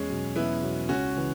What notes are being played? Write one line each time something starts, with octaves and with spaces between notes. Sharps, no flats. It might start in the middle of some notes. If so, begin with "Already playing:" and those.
Already playing: E2 G#3 C#4
B2 F#3
E2 B3 E4
B2 F#3
C#2 C#4 F#4
C#3 E3